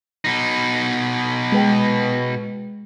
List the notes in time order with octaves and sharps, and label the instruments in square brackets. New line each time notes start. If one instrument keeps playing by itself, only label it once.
[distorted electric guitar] B2 D#4
[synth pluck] G#3 B4 G5